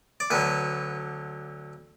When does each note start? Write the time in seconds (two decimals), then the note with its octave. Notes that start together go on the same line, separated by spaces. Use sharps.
0.20 D5
0.30 D2 D3 F#3 B4